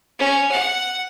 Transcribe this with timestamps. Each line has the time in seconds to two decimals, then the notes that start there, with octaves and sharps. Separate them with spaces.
0.19 C#4
0.51 F#5